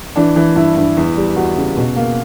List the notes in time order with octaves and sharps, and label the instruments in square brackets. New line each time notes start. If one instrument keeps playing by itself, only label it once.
[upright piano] E3 D4
E3
G2 E4
G2
E2
G3
E2 F#4
C#3
B2
A#3